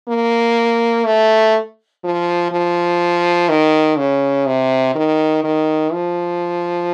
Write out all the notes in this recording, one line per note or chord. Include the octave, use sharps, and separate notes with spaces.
A#3
A3
F3
F3
D#3
C#3
C3
D#3
D#3
F3